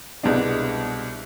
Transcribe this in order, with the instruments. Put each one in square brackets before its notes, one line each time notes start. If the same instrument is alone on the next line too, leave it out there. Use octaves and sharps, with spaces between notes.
[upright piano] C2 B2 G#3 B3 D4